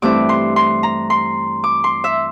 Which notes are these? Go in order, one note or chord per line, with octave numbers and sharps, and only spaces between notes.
G2 E3 A3 C4 E4 D6
C6
C6
A#5
C6
D6
C6
E5